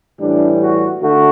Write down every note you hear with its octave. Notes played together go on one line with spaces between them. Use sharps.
A2 E3 G3 D4
F#4
D3 A3 F#4